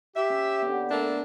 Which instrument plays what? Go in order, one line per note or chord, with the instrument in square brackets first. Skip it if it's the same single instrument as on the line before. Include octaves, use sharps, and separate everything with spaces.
[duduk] G4 [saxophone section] E5
[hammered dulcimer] C#4
D3 B3
[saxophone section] A3 A#3 D4